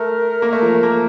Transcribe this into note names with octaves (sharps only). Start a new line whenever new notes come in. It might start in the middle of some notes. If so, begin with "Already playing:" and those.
Already playing: A3 A#4
A#3
A3
F3
A#3